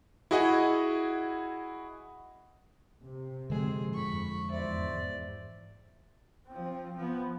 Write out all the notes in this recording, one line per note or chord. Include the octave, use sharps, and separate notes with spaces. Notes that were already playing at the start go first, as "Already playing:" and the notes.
E4 F#4 G#4 D#5 F#5
C3
D3 F3 G#3 C4 G#4
F2 B5 C#6
E2 G#2 C5 D5 E5
F3 C4
F3 B3